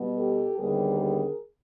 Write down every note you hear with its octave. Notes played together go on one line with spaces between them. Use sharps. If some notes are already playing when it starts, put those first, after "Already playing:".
Already playing: B2 G3 B3
G4 A4
D#2 D3 G3 B3 G#4 A#4
G#4 A#4